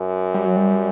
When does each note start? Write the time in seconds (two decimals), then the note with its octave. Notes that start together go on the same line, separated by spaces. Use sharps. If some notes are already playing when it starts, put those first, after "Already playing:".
Already playing: F#2
0.34 G3
0.46 F#3
0.56 G3